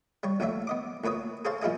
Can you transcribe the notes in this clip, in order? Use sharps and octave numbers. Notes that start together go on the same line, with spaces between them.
G3 C#5
A#1 D3 A3 C#5 E5
B3 D#5 D6
D2 A#2 B4 C#5 D#6
G#4 A4 C5 C#5 F5 A5
A#2 F3 E4 G#4 D#5 G#5